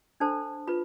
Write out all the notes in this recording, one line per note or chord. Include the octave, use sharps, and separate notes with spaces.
D4 A4 C5 A5
F4 B4 B5